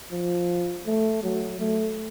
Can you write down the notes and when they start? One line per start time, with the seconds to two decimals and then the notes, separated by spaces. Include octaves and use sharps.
0.12 F3
0.86 A3
1.23 F#3
1.60 A3